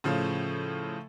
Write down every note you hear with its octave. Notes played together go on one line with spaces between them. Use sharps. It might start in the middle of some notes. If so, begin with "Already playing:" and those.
A2 C#3 F3